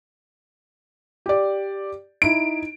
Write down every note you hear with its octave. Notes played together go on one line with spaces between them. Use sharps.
G4 D5
D#4 E4 D7